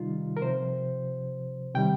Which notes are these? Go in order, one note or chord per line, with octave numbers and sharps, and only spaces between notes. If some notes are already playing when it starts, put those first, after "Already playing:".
Already playing: C3 D#3 G3 D#4 F4
A#4
C3 F3 C5
C3 D#3 G3 G5